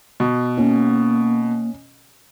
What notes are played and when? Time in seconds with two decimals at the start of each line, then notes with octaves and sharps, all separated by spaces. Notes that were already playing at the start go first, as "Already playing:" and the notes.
0.20 B2
0.57 A#3 C#4